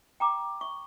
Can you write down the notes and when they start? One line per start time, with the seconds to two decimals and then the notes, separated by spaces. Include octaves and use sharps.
0.20 G5 A#5 D6
0.61 C#6